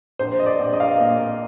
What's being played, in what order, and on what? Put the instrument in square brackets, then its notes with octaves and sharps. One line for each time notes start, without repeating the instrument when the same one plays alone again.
[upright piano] A#1 C5
D#5
D5
A#1
D#5
F5
D#5
A#2 D#5